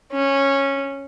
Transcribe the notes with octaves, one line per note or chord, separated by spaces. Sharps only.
C#4